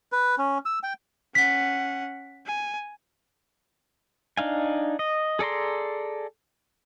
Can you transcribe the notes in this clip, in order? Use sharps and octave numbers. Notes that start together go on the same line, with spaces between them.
B4
C#4
E6
G5
C#4 F#5 B6
G#5
D4 D#4 F5 G#5
D#5
G#4 A4 D5 A#5 C6